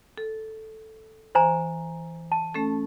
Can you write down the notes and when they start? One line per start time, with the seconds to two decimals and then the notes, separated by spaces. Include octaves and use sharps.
0.18 A4
1.35 E3 C5 G#5 A#5
2.32 A5
2.54 A3 C#4 A4